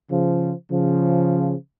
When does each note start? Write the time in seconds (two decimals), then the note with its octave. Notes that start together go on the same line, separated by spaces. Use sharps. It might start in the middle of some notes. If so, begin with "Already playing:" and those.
0.10 C#3 F3
0.70 C#3 F3